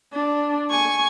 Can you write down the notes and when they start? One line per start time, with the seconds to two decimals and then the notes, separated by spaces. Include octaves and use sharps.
0.13 D4
0.71 G#5 C#6